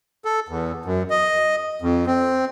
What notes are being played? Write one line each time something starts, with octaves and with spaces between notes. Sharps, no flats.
A4
E2
F#2
D#5
F2
C4